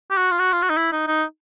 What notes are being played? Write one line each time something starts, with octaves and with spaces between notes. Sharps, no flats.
G4
F#4
F4
F#4
F4
F#4
D#4
E4
D#4
D#4